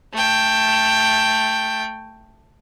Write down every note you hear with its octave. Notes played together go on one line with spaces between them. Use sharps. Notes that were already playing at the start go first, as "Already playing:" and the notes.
A3 G5